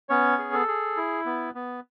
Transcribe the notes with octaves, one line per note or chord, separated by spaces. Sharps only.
B3 C#4 C#5
G#4
A4
G#4
E4
B3
B3